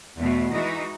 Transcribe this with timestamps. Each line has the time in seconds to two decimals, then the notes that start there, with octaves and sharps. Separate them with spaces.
0.17 E2 B2 A3
0.52 E3 G#3 D#4 F#4